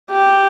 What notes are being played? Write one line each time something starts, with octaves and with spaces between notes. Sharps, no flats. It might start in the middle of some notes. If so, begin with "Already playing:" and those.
G4